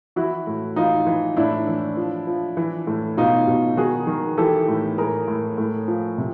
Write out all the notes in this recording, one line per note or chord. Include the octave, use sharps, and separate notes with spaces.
E3 E4 F#4
A2
E3 D#4 F4
E3
A2 D4 E4
E3
F3
F3
E3
A2
B2 D#4 F4
B2
D#3 F#4 G#4
D#3
E3 G4 A4
A2
A2 G#4 A#4
A2
A2
F3
C3